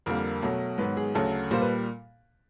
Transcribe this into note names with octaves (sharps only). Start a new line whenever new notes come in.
F2 D3 G3 A#3 A#4
B2 F#3 A3
G#2 D#3 F#3 B3 B4
G#4
D2 C#3 F#3 A4
A#2 G3 A#3 C5
B4